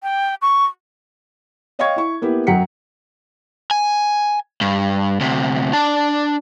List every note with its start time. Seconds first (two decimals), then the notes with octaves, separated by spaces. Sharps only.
0.03 G5
0.42 C#6
1.79 C#5 D#5 F5 G5 C#6 G#6
1.96 E4 C#6
2.22 A#3 B3 E4 G4 B4
2.47 F#2 F#3 F#5 G5 B6 C#7
3.71 G#5
4.61 G2
5.20 D2 C3
5.73 D4 A5